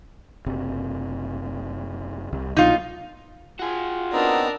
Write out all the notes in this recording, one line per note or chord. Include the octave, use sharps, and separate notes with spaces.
F#1 C3
C2
C2 B2 F#3 D#4 F4
F4 F#4 G#4
B3 C4 D4 D#4 A#4